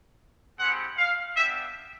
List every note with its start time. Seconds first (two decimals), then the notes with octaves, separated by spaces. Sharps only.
0.58 G#3 C4 E4 G4 F#5
0.98 F5
1.36 B3 D4 G4 E5